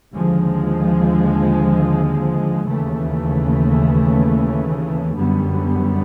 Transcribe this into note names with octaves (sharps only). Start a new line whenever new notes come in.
D#2 D3 F3 G#3
D#2 C#3 E3 A3
F#2 D3 G3 B3